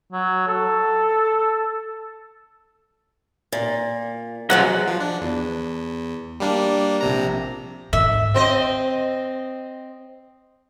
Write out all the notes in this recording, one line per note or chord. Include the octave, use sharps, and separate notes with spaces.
F#3
A4
A#2
C#3 F3 F#3 G#3 F#5
F3
D4
E2
G3 A#3 D4
A#1 C3 A#5
G#2 E5
C4 C5 D#5